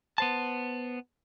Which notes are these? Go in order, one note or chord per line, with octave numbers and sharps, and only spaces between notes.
B3 C5 A5